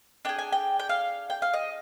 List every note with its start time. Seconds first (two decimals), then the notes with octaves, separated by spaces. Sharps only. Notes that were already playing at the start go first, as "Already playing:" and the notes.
0.25 D4 G#4 G5
0.39 G#5
0.52 G5
0.79 G5
0.89 F5
1.30 G5
1.42 F5
1.54 D#5